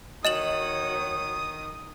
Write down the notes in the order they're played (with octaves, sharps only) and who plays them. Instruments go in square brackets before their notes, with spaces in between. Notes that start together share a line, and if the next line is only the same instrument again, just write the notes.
[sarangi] D#3 [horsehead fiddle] F#4 C#5 [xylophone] D#5 E7 F#7 [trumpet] D#6